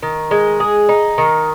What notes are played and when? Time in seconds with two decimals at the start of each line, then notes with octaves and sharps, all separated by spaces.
0.03 D#3
0.31 G#3
0.60 G#4
0.89 D#4
1.18 D#3